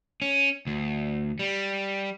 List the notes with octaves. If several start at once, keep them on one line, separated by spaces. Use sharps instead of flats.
C#4
D2
G3